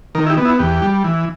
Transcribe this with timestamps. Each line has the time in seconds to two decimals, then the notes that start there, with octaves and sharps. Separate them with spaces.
0.15 D#3 A#4
0.26 E4
0.30 G4
0.37 B3
0.45 E4
0.59 E2 G4
0.82 G3
1.04 E3